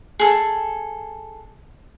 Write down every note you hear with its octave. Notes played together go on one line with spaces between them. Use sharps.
G#4 A4